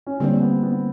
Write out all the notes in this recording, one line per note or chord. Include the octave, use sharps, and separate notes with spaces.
C#4
D3 G3 A#3 C4 D4
B3
B3